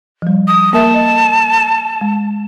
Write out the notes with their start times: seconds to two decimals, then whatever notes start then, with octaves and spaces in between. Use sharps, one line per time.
0.22 F3 G3
0.48 D#6
0.73 A#3 A#4 E5 A5
0.94 D#5
2.01 G#3